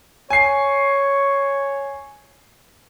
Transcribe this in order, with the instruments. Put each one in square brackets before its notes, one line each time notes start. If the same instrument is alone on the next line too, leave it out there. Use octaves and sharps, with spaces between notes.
[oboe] C#5 [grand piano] G#5 C7